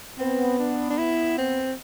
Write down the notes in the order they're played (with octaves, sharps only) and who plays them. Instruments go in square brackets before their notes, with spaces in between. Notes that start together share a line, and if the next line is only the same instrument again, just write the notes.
[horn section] B3 [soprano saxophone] C4
[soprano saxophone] D4
D4
E4
C4